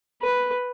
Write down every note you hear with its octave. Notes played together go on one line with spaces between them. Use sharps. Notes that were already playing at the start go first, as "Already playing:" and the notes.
B4